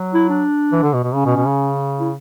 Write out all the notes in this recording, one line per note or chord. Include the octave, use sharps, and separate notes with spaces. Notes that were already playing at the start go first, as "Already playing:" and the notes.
Already playing: F#3
E4
D4
E3
D3
B2
B2
C#3 C#4
B2
B2
C#3
E4